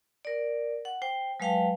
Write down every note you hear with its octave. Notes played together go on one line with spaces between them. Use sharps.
A#4 D5
F#5
C5 G5
F#3 G#3 B4 F5 G5 A5